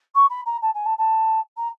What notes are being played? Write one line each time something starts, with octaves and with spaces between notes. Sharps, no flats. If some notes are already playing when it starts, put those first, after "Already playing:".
C#6
B5
A#5
A5
G#5
A5
A5
A#5